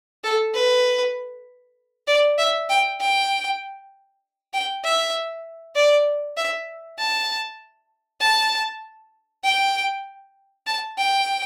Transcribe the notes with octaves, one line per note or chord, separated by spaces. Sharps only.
A4
B4
D5
E5
G5
G5
G5
E5
D5
E5
A5
A5
G5
A5
G5